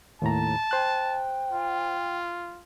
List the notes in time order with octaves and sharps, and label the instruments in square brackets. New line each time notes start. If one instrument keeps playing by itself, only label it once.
[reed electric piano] D#2 A2 A#5 [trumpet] A5
[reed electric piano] C5 F#6 [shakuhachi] G5
[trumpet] F4